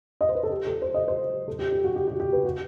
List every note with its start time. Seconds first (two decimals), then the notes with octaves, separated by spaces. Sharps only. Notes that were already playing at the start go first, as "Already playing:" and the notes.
0.21 D#5
0.29 C5
0.35 B4
0.43 A4
0.50 G4
0.67 A4
0.82 C5
0.94 D#5
1.08 C5
1.48 A4
1.59 G4
1.72 G4
1.84 F#4
1.96 G4
2.08 G4
2.20 G4
2.33 B4
2.45 F#4